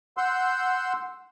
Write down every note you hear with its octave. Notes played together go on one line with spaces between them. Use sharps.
F#5 C6 E6 G6